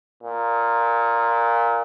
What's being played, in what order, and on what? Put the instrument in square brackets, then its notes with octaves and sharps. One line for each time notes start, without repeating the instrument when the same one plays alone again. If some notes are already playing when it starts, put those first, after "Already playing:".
[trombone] A#2